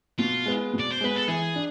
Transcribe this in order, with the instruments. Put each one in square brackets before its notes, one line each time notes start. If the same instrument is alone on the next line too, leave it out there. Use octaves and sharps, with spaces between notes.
[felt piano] B2 [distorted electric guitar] F4
[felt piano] G#3 B3
B2
[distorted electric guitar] D5
C5
[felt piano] G#3 B3 [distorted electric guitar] B4
[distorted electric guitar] A4
[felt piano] E3 [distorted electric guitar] G#4
[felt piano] D4